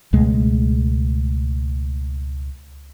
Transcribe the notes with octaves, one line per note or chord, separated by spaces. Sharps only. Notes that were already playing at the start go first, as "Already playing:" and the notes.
C#2 B2 G#3 A3